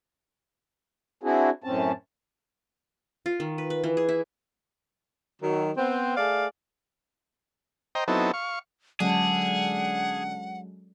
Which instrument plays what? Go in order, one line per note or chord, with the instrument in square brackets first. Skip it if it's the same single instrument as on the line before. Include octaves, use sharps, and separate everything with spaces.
[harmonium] C4 D4 E4 F#4 G#4
F#2 A2 C4 C#4 A5
[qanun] F4
D#3
B4
B4
E3
G#4
E4
[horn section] D#3 F#3
B3 C4
A3 G#4 D5 F5
[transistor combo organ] C5 D#5 G5 A#5
F#3 B3 C4 D#4 E4 A4
F5 C#6
[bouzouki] D3 [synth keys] F#3 G#3 C#4 [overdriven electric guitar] G#4 [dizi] F#5